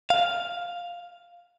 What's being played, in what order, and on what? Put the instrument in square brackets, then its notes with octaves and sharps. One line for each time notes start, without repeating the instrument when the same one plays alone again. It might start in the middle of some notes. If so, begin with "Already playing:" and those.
[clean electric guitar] F5